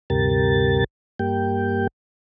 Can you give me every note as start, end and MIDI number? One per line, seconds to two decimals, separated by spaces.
0.10 0.84 38
0.10 0.84 43
0.10 0.84 48
0.10 0.84 67
0.10 0.84 70
0.10 0.84 93
1.19 1.87 43
1.19 1.87 58
1.19 1.87 67
1.19 1.87 79